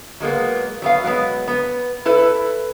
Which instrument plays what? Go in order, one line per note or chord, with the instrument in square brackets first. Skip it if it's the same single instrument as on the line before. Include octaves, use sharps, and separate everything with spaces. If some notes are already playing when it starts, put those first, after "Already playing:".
[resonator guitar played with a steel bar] F#3 G#3 A#3 B3
F#3 B3 F5
F#3 G#3 B3
B3
E4 A4 B4